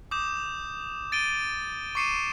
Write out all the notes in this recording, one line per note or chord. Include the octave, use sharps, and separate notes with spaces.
D6 D#6 G6 E7
A6 D7 D#7 G7
C#6 D6 C7 C#7 D#7 E7